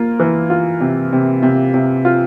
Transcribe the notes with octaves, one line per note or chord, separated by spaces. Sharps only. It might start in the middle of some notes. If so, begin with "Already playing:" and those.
Already playing: A#3 F4
E3
F4
C3
C3
C3
C3
F4